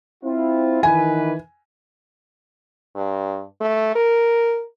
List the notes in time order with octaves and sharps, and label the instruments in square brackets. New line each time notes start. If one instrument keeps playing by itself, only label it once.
[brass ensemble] C4 E4 F4
[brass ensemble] D#3 E3 B4 [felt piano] G#5
[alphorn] G2
A3
A#4